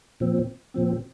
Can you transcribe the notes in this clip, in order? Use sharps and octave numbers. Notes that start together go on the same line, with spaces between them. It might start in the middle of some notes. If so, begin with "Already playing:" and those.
A#2 F3 C4
A#2 F3 C4